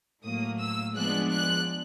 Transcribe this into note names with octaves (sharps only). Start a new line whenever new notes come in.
A2 F#3 A#3 D#6
E6
F3 G#3 B3 D4 F#6
F#6